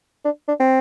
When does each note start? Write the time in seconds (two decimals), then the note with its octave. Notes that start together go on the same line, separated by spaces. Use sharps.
0.25 D4
0.48 D4
0.60 C4